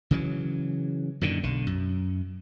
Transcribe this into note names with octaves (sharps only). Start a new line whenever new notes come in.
C#3 E3 F#3
F#2 A#2 D3 D#3
B1 D3
F#2